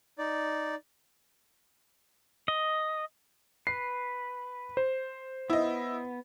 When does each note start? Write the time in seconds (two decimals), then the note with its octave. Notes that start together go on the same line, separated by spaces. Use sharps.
0.18 D#4 D5
2.48 D#5
3.67 B4 C7
4.77 C5
5.50 B3 E4 D#5